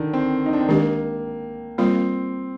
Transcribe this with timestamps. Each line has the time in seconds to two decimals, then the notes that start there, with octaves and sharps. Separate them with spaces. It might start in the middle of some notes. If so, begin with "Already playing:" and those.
Already playing: D3 D#3
0.13 C4
0.46 D#4
0.53 D4
0.61 C4
0.68 D#3 G#3 A#3 D4 G4
1.78 G3 A#3 C4 F4 A#4